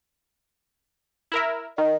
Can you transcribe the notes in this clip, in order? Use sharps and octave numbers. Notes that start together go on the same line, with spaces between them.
E4 A#4 E5
D#3 D#5